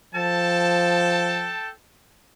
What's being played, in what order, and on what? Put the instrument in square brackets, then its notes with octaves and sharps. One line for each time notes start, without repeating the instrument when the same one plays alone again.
[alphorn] F3 [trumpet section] A4 G5 A5